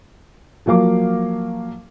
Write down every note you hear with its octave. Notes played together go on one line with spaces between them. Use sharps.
F3 F#3 A#3 F5 D6